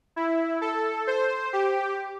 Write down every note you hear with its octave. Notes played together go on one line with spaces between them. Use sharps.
E4
A4
C5
G4